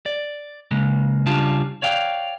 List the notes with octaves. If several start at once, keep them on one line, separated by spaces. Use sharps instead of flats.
D5
C#3 G#3 A#3
C#3 G3 D4 F4 A5
C#5 D5 F5 G5